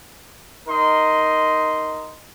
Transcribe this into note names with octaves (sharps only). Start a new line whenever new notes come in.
D#4 A#4 D#5 C6